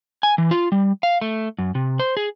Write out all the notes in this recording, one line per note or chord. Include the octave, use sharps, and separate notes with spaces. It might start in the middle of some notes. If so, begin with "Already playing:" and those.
G#5
E3
F4
G3
F5
A3
F#2
C3
C5
G#4